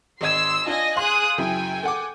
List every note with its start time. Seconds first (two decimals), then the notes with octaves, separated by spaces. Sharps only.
0.21 G#1 D#5 C6 E6 G#6
0.67 D4 F4 D#5 G#5 A#6
0.96 G#4 F5 C6 D#6 F#6
1.38 C#2 F#2 E4 G5 G#5
1.83 A4 F#5 D6